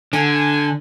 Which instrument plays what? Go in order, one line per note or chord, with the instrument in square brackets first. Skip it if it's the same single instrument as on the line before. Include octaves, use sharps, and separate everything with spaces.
[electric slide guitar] D3 [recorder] G#5